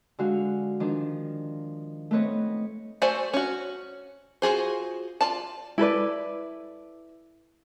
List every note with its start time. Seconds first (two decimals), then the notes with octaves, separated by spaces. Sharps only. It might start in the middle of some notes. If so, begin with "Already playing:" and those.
0.19 D3 G#3 F#4 F5
0.80 D#3 F3 D4 D#4
2.11 A3 B3 C4 B4 C#5 D#5
3.02 A3 F#4 C5 D5 G#5
3.33 C#4 F#4
4.42 F4 F#4 G#4 C5
5.21 F4 D5 A5
5.78 E4 A4 B4 D5